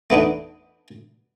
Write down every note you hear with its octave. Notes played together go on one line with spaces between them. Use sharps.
A3 B3 D4 D#4